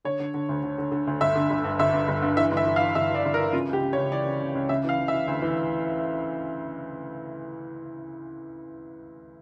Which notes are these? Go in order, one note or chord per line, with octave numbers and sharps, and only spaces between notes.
D3 C#5
D3
D3
D2
D3
D3
D3
D2
G1 E5
D3
G1
G2
G1 E5
G2
G1
G2
E3 E5
G1
E5
E3
F5
E3
G1 E5
E3 D5
G1
A#4
E3
C#3 F4
C#2 G4
C#3
C#5
C#2
E3 D5
C#3
C#3
C#2
C#3 E5
E3 F5
E3
E5
E3
D2
E3